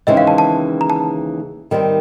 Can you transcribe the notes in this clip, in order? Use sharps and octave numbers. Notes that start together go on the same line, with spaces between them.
D#2 C#3 E3 G#3 C4 D#5
F5
A5
A5
A#5
A5
D#3 G3 C4